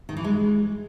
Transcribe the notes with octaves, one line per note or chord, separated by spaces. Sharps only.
D#3
E3
G#3